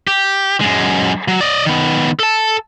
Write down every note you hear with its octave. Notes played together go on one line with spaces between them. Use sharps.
G4
F#2 G#3
F#3
D5 D#5
D#3 B3
A4 A5